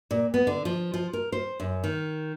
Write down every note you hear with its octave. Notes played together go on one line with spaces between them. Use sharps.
A#2
B3
D3
F3
F3
A#4
C5
F#2
D#3